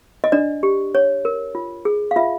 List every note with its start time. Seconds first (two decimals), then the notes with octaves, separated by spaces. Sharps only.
0.24 D#5
0.32 D4 D5
0.63 G4
0.95 C#5
1.25 A#4
1.55 F4
1.85 G#4
2.11 F5
2.16 F4 E5